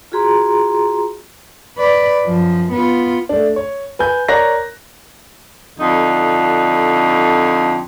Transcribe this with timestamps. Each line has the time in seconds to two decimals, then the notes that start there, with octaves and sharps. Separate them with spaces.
0.12 F4 F#4 G#4 A#5 C6
1.78 B4 D5
2.25 F#2 F3
2.72 B3 F4
3.29 A3 D4
3.56 C#5
3.99 B4 G#5 G6
4.28 A#4 C#5 D5 A#5 F#6 A#6
5.78 F2 D3 D#4